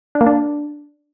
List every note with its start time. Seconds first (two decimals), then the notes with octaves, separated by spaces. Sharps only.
0.15 D4
0.21 A#3
0.27 D4